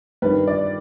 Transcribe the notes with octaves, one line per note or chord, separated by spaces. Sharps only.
G2 D#3 G3 B4
D5